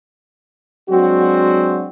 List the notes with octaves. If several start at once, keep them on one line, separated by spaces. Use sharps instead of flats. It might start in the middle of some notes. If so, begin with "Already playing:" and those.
F#3 G#3 C4 D4 F#4